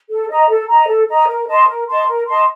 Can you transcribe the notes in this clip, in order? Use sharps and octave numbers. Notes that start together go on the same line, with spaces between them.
A4
D#5 A#5
A4
D#5 A#5
A4
D#5 A#5
A#4
D#5 A5 C6
A#4
D#5 A5 C6
A#4
D#5 A5 C6